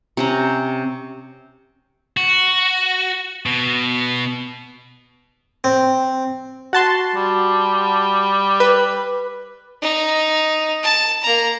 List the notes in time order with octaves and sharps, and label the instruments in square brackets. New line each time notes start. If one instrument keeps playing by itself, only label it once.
[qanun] C3 C#4 A#5
[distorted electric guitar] F#4
B2
[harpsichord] C4
[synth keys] F#4 A5 C6
[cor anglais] G3
[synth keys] B4
[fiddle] D#4
A5
A#3 A#5